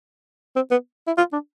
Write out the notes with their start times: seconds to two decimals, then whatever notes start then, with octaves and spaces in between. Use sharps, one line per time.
0.56 C4
0.71 B3
1.07 E4
1.18 F4
1.33 D4